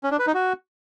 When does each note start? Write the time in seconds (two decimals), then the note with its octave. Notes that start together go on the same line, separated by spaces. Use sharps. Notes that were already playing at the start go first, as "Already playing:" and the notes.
0.04 C#4
0.11 D4
0.19 B4
0.27 D#4
0.34 F#4